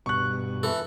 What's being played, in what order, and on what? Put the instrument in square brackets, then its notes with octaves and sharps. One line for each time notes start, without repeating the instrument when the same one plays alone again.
[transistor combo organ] G2 B2 [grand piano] C#6 F#6
[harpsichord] E3 A4